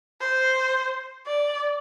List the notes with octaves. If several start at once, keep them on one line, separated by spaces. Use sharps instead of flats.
C5
D5